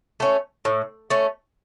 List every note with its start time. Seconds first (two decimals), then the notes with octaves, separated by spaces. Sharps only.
0.20 A3 C#4
0.65 A2
1.10 A3 C#4